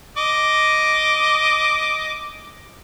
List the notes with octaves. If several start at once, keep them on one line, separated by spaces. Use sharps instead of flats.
D#5 D6